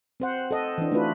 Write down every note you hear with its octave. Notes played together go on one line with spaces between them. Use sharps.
C4 C5 F#5
A4 D#5 F#5
E3 D4
A3 D4 D#4 F4 F#4 B4